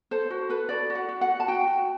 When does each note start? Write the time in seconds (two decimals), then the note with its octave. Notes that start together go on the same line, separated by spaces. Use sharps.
0.11 A4 C5
0.30 F#4 C5
0.49 A4 B4
0.69 F#4 D5
0.90 F#4
0.95 F#5
1.09 F#4
1.21 F#5
1.29 F#4
1.40 A5
1.48 F#4 G5
1.67 F#4